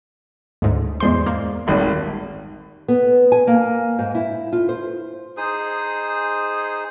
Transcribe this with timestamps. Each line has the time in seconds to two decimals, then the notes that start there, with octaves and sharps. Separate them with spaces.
0.62 D2 G#2
1.00 E2 G#3 C5 D5 C6
1.26 A#3
1.67 D#1 G#1 D#3
2.88 B3
3.32 G#5
3.47 A#3
3.99 G#2
4.15 E4
4.53 F4
4.69 C5
5.37 D#4 G#4 C5 D#6